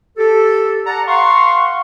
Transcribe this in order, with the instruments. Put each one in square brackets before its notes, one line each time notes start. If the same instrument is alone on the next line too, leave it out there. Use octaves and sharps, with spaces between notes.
[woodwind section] G4 A4
D5 F#5 A5 A#5
F5 F#5 C6 C#6